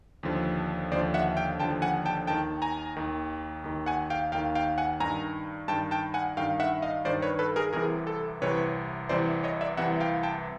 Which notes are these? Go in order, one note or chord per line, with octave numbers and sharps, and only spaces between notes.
D#2 D3 F3
D#2 D3 F3 C5 D5
E5 F#5
F5 G5
D#2 D3 F3 G5 A5
F#5 G#5
G5 A5
D#2 D#3 G5 A5
G#5 A#5
D#2 D#3
D#2 D#3
F#5 G#5
F5 G5
D#2 D#3 F5 G5
F5 G5
F#5 G#5
G2 D#3 G#5 A#5
G2 D#3 G5 A5
G5 A5
F#5 G#5
G2 D#3 F5 G5
E5 F#5
D#5 F5
G2 D#3 C5 D5
B4 C#5
A4 B4
G#4 A#4
C2 C3 E3 G#4 A#4
A4
C2 C3 E3 B4 C#5
C2 C3 E3 C5 D5
C#5 D#5
D5 E5
C2 C3 E3 E5 F#5
F5 G5
G5 A5